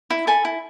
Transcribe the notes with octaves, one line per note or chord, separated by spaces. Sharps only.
E4
A4 G#5 B5
E4